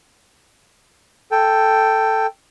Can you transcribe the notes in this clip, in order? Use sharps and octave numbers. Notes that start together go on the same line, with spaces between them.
A4 G5